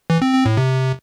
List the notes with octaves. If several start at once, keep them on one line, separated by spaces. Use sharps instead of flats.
E3
C4
C4
A2
C3